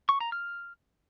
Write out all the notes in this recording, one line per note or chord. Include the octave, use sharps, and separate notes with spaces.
C#6
A#5
F6